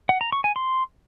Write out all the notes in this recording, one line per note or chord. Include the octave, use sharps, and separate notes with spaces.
F#5
A#5
C#6
G#5
C6